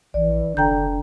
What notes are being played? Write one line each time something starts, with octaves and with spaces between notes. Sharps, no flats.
A#1 E3 D5
F1 D3 D4 G5 A#5 G6